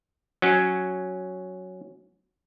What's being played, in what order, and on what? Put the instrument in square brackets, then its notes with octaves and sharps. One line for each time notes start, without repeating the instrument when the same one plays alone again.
[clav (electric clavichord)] F#3 C#4